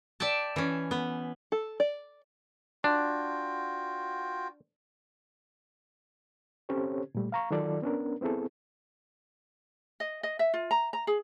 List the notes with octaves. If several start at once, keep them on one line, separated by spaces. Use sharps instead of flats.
D5 E5 G5 A5
E3 C#4
B3
A4
D5
D4 F4 F#4 G5
C4 C#4 G4 A4 C5 C#5
A#2 G3 A3
F5 A#5 C#6
D#3 F#3 F4 A4 D5
B3 C#4 D4 A#4
B3 C4 E4 G#4 A4
D#5
D#5
E5
F4
A#5
A#5
G#4